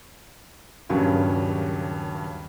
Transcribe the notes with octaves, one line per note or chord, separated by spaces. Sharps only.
D#1 G2 C#3 F#3 C#4 A#4